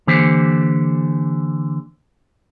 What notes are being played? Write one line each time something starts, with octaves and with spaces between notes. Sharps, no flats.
D3 E3 A#3 G4 C5